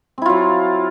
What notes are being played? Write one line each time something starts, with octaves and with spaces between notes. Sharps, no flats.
F#3 C4 E4 F4